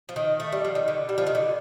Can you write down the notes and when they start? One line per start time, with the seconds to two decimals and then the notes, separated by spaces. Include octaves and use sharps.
0.09 F3
0.16 D#3
0.40 A3
0.52 G3
0.65 F3
0.75 D#3
0.88 D3
1.09 G3
1.18 F3
1.26 D#3
1.35 D3